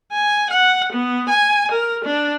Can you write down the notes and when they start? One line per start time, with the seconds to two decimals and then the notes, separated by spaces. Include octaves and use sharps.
0.12 G#5
0.50 F#5
0.92 B3
1.29 G#5
1.72 A#4
2.05 D4